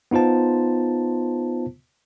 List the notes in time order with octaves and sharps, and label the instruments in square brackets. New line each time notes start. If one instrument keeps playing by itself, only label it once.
[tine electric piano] B3 D#4 F4 C5 A5